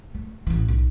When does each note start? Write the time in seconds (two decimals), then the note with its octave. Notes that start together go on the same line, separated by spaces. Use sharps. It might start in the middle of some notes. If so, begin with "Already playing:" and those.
0.15 A3
0.47 A1 E3
0.68 B1